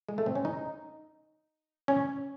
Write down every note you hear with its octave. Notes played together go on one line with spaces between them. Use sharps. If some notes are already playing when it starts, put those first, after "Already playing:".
G#3
A3
C4
C#4
D#4
C#4